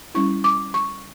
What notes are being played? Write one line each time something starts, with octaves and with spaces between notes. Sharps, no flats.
G3 C#4 E4 C#6
D6
C#6